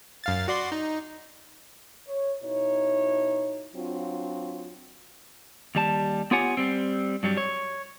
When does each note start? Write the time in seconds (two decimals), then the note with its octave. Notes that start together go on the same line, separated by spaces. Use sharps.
0.24 F#2 F5 A6
0.48 F#4 D5 C6
0.72 D#4
2.07 C#5
2.43 B2 D#4 E4 C#5
3.75 F#3 C4 D4 F4
5.75 D#2 G3 A5
6.31 B3 F4 G4 C#5 F#5 G#5
6.57 G3 C4
7.23 G2 F#3 G3
7.37 C#5